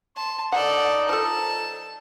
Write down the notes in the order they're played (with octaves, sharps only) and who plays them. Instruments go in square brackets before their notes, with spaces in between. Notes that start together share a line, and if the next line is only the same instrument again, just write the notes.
[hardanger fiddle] A5 [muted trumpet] C6
[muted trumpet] D#4 [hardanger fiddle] A4 D5 [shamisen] F#5
[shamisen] F3 A4 [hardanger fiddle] A5